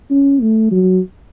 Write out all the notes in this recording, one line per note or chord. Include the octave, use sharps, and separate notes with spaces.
C#4
A3
F#3